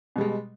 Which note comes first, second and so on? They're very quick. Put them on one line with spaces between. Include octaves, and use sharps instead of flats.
B2 G3 G#3